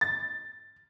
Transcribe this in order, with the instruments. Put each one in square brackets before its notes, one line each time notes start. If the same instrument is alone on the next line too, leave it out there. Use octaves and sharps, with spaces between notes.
[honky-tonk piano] A6